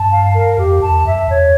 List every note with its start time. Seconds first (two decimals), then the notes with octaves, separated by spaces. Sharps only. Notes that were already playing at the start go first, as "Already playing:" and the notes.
Already playing: G2 A5
0.11 F5
0.34 A#4
0.57 F2 G4
0.80 E2 A5
1.04 F#2 E5
1.28 E2 C#5